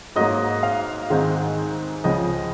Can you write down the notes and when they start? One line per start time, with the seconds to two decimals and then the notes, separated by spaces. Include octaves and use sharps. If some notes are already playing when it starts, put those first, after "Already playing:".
0.16 G#2 F#3 A#3 D#5
0.63 F5
1.10 G#2 D#3 G#3 C4 D#4
2.04 C#2 C#3 F3 C4 D#5